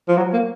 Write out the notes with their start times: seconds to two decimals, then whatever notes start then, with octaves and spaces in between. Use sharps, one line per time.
0.08 F3
0.17 F#3
0.33 A#3